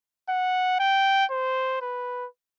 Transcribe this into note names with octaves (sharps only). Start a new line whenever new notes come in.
F#5
G5
C5
B4